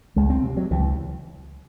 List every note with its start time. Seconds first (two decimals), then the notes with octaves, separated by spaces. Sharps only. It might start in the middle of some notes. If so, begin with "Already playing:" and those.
0.16 C#2 G#3
0.30 C4
0.43 C3
0.57 F#3
0.71 C#2 E3